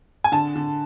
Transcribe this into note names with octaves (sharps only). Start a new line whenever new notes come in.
G#5
D3 A5
D3